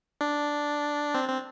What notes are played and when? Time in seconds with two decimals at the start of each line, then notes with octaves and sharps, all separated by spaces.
0.21 D4
1.15 C4
1.29 C4